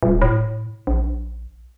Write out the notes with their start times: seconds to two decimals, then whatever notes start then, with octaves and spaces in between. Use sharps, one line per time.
0.03 D#1
0.22 A2
0.87 A#1